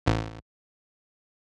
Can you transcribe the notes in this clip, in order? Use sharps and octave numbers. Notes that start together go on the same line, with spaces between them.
A1